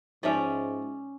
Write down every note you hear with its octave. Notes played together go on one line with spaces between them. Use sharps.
G#2 F3 C#4 D#4 D5 E5